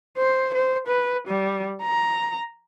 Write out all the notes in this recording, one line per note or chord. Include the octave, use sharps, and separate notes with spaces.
C5
C5
B4
G3
A#5